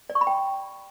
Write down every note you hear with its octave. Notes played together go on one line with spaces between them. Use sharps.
D5
C#6
B5
G5